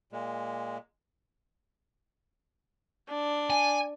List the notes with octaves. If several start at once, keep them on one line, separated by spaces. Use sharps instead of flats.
A#2 G#3
D4
G#5